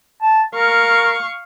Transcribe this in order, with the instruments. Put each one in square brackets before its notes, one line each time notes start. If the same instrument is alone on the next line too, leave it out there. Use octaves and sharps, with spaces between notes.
[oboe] A5
[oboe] A#4 [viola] F5 C#6